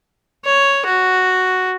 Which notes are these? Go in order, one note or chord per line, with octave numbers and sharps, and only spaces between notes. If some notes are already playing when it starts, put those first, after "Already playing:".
C#5
F#4